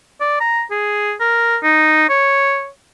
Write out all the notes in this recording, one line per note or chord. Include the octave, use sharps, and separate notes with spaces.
D5
A#5
G#4
A#4
D#4
C#5